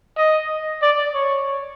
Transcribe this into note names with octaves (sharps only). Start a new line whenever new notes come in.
D#5
D5
C#5